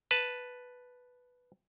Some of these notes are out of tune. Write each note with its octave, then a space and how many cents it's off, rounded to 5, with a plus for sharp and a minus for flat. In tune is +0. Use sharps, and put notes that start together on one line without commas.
B4 +0 A5 +0